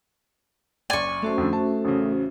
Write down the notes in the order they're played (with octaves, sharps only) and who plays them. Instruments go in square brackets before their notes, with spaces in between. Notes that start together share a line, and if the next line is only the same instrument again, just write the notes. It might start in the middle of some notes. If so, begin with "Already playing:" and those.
[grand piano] F#1 D5 [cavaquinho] G#5 C#6
[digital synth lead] A3 [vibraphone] C#4 F#4 C5
[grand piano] F2 D3
A5
A1 C#3